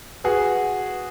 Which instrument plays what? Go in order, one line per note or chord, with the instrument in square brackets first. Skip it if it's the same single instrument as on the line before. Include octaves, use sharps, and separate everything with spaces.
[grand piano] F#4 G#4 [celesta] B4